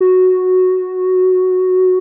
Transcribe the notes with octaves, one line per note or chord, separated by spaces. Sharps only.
F#4